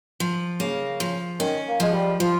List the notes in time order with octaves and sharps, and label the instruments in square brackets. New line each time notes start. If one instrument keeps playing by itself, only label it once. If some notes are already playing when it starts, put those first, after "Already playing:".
[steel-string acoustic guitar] F3
[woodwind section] C#3 [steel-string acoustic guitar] A#3
[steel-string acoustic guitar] F3
[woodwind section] D#3 [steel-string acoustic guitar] C#4
[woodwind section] A#3
[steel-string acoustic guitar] F3 [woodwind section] G#3
[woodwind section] G3
[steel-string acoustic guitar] F3 [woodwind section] F4